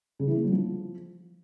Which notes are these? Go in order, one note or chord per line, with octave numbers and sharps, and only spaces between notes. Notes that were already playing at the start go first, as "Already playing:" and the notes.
C#3
E3
A#3
F#3
F3